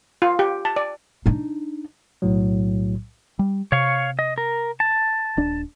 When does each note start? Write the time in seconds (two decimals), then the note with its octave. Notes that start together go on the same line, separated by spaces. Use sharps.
0.22 F4
0.39 G4
0.65 A5
0.76 D5
1.26 D4 D#4
2.22 B1 A2 F#3
3.39 G3
3.72 C3 C#5 F5 C#6
4.19 D#5
4.38 A#4
4.80 A5
5.37 D#1 D4